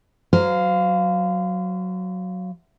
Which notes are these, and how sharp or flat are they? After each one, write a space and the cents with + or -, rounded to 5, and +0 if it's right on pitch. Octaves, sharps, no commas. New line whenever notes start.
F#3 +0 C5 -35 F5 +0